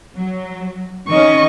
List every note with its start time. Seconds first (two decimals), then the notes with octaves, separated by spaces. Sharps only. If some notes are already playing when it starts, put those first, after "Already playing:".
0.16 F#3
1.08 D#3 C#4 D#5 C#6